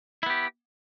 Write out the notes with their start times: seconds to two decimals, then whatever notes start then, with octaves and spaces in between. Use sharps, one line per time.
0.23 E4
0.26 B3
0.30 G4